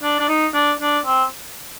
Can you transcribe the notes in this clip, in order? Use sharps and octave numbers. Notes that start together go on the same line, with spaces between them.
D4
D4
D#4
D4
D4
C4